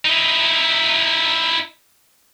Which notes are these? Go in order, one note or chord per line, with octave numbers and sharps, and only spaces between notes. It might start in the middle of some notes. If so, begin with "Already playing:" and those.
D#4 E4